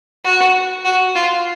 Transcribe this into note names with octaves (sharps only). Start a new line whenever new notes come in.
F#4
F#4
F4